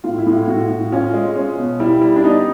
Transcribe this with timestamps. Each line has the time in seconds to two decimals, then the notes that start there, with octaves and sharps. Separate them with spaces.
0.04 A2 F4
0.18 E4
0.26 A2 F4
0.48 A2 F#4
0.70 A2
0.92 C#4 F4
1.14 G#3
1.35 C#4
1.58 B2
1.80 G3 E4
2.01 G3
2.16 D4
2.24 B3 D#4